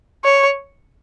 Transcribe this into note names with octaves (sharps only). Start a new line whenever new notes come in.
C#5